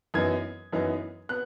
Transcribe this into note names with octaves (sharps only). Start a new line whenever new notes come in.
F#2 E3 B3 D#4 G#6
F#2 E3 B3 D#4
B3 F#6